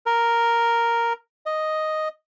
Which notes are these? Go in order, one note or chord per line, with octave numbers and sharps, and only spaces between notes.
A#4
D#5